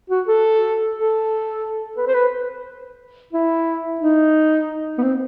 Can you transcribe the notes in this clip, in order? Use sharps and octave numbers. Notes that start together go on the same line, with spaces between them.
F#4
A4
A4
B4
C5
B4
E4
D#4
B3
C4